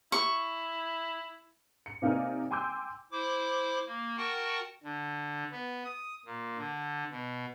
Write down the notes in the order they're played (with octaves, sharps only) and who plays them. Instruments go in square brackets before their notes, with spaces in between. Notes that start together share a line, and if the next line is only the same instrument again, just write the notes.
[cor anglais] E4 [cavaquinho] C#6
[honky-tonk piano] C#7
C3 A#3 D#4 A#4 D5 G#5
G5 G#5 C6 D6 E6 G6
[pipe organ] E4 C5 D6
A#3
F#4 A#4 F#5 G5 A5 C#6
D3
B3
D#6
A#2
D3
B2